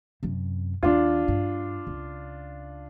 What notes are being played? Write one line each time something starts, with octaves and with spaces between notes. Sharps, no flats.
F#2 C3
D#2 D#3 D4 F4
G2
C#2